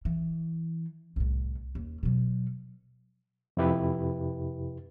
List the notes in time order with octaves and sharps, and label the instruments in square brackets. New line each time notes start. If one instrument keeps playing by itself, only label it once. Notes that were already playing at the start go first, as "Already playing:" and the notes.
[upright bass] E3
C2 A2
D#2
B2 F#3
[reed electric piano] F2 C3 E4 G4 B4